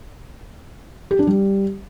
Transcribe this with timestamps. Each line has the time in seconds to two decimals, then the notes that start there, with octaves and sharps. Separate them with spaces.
1.11 G4
1.19 D4
1.27 G3